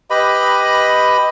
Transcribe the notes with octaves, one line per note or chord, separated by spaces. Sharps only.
G4 B4 D#5 B5